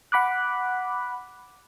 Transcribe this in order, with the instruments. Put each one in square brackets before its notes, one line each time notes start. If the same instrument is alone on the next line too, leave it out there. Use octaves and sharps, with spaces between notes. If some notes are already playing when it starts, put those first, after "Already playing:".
[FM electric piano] F#5 B5 D6 F#6